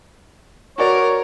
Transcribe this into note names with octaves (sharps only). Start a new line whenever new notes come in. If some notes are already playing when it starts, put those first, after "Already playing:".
F#4 A#4 C#5 D5